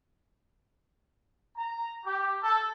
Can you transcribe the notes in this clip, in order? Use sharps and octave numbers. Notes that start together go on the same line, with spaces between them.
A#5
G4
A4